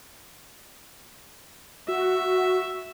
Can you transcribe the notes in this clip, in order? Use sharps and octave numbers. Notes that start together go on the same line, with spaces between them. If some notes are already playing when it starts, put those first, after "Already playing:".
F#4 E5